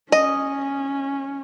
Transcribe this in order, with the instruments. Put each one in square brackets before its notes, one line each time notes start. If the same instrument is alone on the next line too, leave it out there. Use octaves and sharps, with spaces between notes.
[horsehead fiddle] C#4 [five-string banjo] D#5